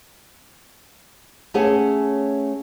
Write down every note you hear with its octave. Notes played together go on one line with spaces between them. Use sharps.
A3 C#4 G#4 C#5 F#5